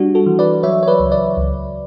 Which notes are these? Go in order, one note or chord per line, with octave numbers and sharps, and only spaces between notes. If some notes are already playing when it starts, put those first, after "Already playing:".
Already playing: G3 D4 F#4
F#4 A4
E3
B4 D5
F#3 C#5 E5
C#5
B4 D5
C#2
B4 D5
C#2